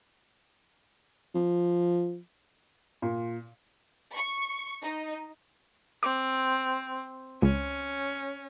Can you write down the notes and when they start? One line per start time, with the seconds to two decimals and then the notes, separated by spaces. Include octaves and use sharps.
1.35 F3
3.02 A#2
4.14 C#6
4.82 D#4
6.03 C4 D6
7.42 C#2 C#4